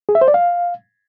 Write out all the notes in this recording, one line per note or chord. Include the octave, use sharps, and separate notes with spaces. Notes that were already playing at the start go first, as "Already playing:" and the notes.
G#4
E5
C5
D5
F5